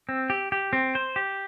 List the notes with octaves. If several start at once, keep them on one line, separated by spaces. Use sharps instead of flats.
C4
G4
G4
C4
C5
G4